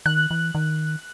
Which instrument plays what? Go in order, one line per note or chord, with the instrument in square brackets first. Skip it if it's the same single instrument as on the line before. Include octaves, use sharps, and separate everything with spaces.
[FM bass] D#3 [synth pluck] F#6
[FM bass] E3
D#3